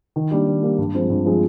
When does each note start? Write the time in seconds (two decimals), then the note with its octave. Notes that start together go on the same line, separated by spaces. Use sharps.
0.16 D#3
0.31 G3 A#3 D4
0.47 D#3
0.63 G3 A#3 D4
0.78 G2
0.94 F3 G#3 C4
1.10 G2
1.25 F3 G#3 C4